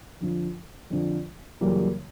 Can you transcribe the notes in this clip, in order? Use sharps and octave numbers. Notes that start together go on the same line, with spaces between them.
F2 D3 F3
F2 D3 F3
F#2 C#3 E3 G3 A#3